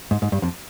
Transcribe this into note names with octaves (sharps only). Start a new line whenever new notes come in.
G#2
G#2
G2
F2